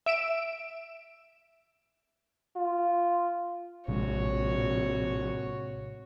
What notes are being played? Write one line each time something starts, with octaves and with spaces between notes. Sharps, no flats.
E5 D7 E7
F4
A#1 A2 C3 G#3 C4 F#4 C#5